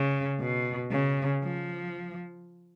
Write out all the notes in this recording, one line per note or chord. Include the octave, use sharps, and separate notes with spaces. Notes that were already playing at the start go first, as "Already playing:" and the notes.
Already playing: C#3
B2
C#3
F3